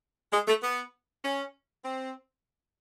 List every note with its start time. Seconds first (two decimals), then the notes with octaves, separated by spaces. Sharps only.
0.33 G#3
0.47 A3
0.62 B3
1.23 C#4
1.84 C4